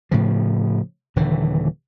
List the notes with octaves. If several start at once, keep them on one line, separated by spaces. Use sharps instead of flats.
A2 C#3 F3
D#1 D3 E3